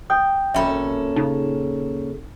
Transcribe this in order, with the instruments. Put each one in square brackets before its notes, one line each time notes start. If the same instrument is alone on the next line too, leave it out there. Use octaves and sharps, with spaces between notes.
[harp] G5 [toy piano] D#6
[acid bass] G#1 [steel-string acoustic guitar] A#2 C#4 A4 [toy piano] E5 B5
[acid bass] C#3 [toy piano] D#4